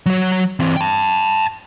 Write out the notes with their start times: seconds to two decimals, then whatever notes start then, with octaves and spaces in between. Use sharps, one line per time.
0.06 F#3 C#5
0.60 E3 C4
0.77 G5 A5